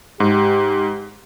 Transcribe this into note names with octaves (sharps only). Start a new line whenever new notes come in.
G#2 G4